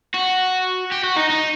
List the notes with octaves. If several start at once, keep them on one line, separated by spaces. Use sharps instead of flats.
F#4
G4
F#4
D#4
D#4